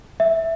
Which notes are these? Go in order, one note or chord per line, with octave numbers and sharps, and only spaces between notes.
E5